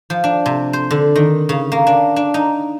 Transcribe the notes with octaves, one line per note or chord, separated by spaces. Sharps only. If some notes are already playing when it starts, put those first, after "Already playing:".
F3
D4
C3
C5
D3
D#3
C#3
A#3
D4
D4
D#4